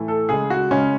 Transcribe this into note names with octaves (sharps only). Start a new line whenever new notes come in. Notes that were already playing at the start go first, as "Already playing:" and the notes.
Already playing: A2 E3 A3
A4
C#3 G#3 G#4
F#4
C#3 G#3 C#4